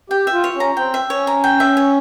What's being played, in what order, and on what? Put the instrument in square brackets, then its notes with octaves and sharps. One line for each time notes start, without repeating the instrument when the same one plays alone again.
[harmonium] G4 [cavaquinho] G5
[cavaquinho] E5
[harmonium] F4
[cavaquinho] C#5
[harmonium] C#4
[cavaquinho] A#5
[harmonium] C4 [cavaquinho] G5
[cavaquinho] E5
[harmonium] C#4 [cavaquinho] C#5
[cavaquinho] A#5
G5
E5
C#5